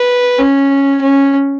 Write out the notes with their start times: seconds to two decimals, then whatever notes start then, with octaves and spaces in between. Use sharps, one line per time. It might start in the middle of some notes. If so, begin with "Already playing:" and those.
Already playing: B4
0.39 C#4
1.02 C#4